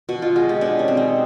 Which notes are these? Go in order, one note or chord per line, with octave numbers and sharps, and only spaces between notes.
B2 F#4
F4
G#3 F#4
G4
B2 D4
C#4
C4
D#4